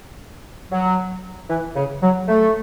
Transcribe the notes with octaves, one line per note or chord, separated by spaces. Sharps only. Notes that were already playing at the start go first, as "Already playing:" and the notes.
F#3
E3
C#3
F#3
A3